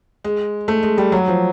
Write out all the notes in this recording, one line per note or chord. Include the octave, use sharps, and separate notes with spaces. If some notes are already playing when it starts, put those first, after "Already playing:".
G#3
A3
G#3
G3
F#3
F3